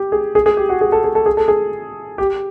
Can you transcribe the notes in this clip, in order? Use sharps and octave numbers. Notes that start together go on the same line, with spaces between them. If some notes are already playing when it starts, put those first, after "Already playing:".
Already playing: G4
G#4
G#4
G#4
G4
F#4
G#4
A4
G#4
A4
G#4
A4
G#4
G4